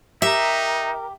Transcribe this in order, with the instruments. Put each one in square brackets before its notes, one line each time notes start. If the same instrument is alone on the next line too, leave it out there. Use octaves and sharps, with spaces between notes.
[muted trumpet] D#4 [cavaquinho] G4 A#5 [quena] A#4 [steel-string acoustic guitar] E5